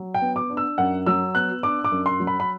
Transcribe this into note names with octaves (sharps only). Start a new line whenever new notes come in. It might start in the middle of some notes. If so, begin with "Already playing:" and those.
Already playing: F#3
G5
B3
D6
D4
E6
F#2 F#5
F#3 E6
B3 F#6
D4 D6
D6
F#2
C6
F#3
B5
B5